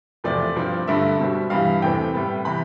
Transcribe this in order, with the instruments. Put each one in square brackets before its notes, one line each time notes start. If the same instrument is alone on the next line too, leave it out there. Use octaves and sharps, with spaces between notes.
[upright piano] E2 C3 F3 A3 C4 D5
G2 F3 C4
G2 D3 A3 E5
B2 G3 C4
G2 E3 G3 F5
E2 C3 E3 A3 C4 G5
A2 G3 B3
C3 E3 B3 B5